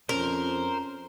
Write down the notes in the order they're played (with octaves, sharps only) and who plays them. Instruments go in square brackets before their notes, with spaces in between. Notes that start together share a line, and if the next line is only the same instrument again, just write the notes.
[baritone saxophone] F2 [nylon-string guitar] C#4 [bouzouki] A#4 [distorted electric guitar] C5